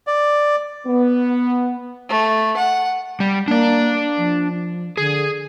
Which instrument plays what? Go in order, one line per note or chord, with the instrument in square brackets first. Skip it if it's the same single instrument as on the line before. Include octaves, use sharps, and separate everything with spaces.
[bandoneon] D5
[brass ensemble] B3
[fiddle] A3
F#5
[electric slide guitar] G3
[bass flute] A#3 [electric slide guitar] D4 D5
[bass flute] F3
[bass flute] D3 [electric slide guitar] G#4